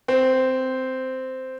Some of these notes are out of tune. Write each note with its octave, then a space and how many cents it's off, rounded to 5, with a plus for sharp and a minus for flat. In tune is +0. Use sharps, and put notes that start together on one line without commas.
C4 -10